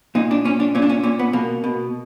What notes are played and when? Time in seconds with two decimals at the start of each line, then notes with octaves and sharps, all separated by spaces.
0.15 A#2 D#4
0.31 D4
0.44 A#2 C#4
0.60 D4
0.75 A#2 C#4
0.82 D4
0.89 C#4
1.04 A#2 C#4
1.19 B3
1.33 B2 A#3
1.64 B2